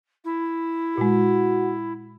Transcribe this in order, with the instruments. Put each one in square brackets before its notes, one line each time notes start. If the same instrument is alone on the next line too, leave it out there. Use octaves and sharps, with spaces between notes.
[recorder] E4
[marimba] A#2 G#3 [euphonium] F#4